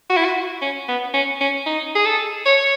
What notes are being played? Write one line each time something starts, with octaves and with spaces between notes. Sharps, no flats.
F#4
E4
F#4
C#4
B3
C#4
C#4
D#4
G#4
A4
C#5